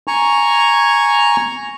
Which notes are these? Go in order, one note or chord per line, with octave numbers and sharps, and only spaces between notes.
G#5 A#5 C#6